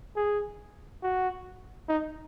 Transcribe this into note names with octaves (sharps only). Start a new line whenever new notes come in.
G#4
F#4
D#4